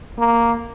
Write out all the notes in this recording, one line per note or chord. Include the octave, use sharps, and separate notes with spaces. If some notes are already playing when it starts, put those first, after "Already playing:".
A#3